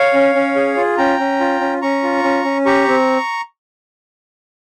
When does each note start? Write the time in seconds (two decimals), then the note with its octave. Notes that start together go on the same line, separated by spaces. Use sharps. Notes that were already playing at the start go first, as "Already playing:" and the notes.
Already playing: C#5 F5
0.14 C#4
0.35 C#4
0.56 G#4
0.77 F4
0.98 C#4 G5 A#5
1.19 C#4
1.40 F4
1.61 C#4
1.82 C#4 A#5 C#6
2.03 F4
2.24 C#4
2.45 C#4
2.66 G4 A#5 C#6
2.88 C4